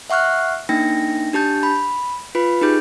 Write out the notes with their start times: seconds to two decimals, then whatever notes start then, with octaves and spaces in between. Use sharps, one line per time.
0.10 E5 F#5 C#6 F6 F#6
0.69 A#3 D4 D#4 G5 A#6
1.33 D4 G4 A5 G6
1.63 B5
2.35 F4 B4 B5
2.61 D#4 G4 G#4 G6